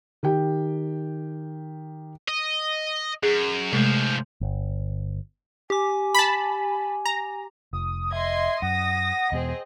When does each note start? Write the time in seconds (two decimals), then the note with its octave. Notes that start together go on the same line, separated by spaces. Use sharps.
0.23 D#3 G4 G5
2.28 D#5
3.23 F#2 G#4
3.73 G#2 C3 F3 G#3 A3
4.41 G1
5.70 G4 G#5 D6
6.14 A5 B5
7.06 A#5
7.73 F1 D#6
8.13 D#5 E5 C6 G#6
8.62 F#2 F#5 D#6 A#6
9.32 E2 B2 C4 G#4 D#5